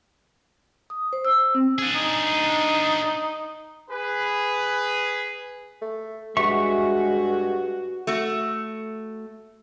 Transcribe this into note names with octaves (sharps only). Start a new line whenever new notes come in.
D#6
C5
E6
C4
D4 G#4
D#4
G#4 B4
A3
G2 G#3 F#4 E5 C#6
A3 F#4